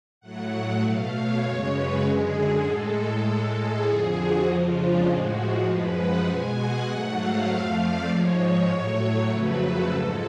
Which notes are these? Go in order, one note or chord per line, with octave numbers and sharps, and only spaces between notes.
A2 F#3 A3 F#5
F#5
B2 A3 F5
C#5
F#2 C#3 G#3
B4
F#2 D3 G#3 G#4
G#4
A2 G#3 A4
A2 G#3
G#4
F2 D3 F3
F#4
F2 C#3 F3 G#3 F4
D4
A2 F3 G#3 F#4
F#2 F3 G#3 B4
F#5
B2 G#3 G#5
F#5
G#2 F#3 A3
F5
F2 F3 A3
D5
G#2 F3 G#3 C#5
A2 F#3 A3
F2 C#3 F#3 A3 B4
A4
G#2 F3 G#3